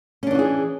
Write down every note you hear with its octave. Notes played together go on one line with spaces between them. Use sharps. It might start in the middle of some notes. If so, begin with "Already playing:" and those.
E3 C#4 D4 F#4 G#4